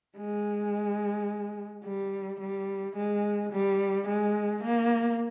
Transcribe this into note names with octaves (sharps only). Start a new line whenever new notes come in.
G#3
G3
G3
G#3
G3
G#3
A#3